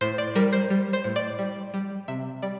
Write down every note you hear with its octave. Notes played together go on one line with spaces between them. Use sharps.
A2 C5
D5
G3 A#4
C5
G3
C5
A2
D5
G3
G3
C3 E5
G3 D5